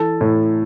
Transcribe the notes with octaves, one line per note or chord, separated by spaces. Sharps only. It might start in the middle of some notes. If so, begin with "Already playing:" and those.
Already playing: E3 A4 A5
A2